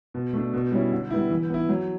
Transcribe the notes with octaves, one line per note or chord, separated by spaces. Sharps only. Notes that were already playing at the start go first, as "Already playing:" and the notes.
B2
A3 D4
B2
G3 C#4 E4
D3
G3 B3 E4
E3
B3 E4
F#3